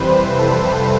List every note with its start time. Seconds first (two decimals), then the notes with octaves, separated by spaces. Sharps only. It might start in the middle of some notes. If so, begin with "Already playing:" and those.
Already playing: F2 C3 E3 G3 B4 C5
0.38 A4